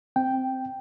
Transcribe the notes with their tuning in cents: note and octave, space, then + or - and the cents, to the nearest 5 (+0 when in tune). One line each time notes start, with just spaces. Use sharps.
C4 +0 G5 +0